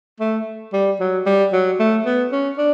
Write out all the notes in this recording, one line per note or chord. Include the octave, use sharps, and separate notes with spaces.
A3
G3
F#3
G3
F#3
A3
B3
C#4
D4